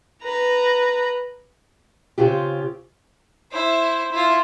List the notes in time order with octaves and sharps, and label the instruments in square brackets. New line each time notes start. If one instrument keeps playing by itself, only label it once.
[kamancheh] B4 A#5
[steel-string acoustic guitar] C#3 C4 F4 G4
[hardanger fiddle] E4 C5
E4 F4